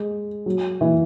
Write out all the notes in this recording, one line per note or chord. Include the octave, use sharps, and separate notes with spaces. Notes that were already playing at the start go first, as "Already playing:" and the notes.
Already playing: G#3
F#3
E3